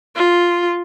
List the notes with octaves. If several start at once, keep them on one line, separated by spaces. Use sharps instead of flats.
F4